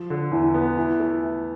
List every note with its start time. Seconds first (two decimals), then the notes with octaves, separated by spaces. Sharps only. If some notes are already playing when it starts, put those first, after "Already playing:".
Already playing: F3
0.10 D3
0.32 E2 E4
0.54 B3
0.77 E3 E4
1.00 A3
1.22 E3